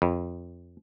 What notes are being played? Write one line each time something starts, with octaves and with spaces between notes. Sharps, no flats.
F2